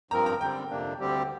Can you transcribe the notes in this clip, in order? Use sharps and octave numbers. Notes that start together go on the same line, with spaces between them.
G2 F3 C4 A#4 A#5
A#5
D3 G3 C4 G5
F2 C3 A#3 D4
D2 D3 G3 C4 G4